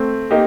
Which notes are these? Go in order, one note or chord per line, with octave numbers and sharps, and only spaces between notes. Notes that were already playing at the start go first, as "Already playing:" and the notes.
Already playing: A3 C4
A#3 D#4 G4